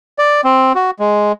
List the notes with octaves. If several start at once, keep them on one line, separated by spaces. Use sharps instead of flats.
D5
C4
F#4
G#3